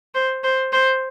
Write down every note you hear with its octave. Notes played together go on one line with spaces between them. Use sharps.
C5
C5
C5